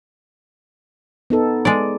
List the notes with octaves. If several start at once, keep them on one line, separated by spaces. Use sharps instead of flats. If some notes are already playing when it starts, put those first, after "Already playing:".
B3 D#4 A4
G#3 D5